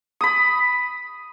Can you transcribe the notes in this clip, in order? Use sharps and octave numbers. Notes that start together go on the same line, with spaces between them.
B5 D#6